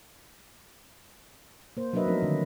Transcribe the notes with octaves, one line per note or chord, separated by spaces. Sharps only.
A#3 C5
F#3 D4 A#4 B4 D#5 E5
F3 A3 C4 D#4 A#4
D3 D#3